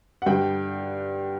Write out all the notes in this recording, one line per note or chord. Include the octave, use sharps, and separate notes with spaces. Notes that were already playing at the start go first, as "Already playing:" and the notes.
F#5
G2 D3 G5